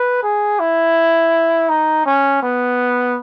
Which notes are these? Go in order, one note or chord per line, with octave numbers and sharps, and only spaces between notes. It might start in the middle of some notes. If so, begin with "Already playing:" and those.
Already playing: B4
G#4
E4
D#4
C#4
B3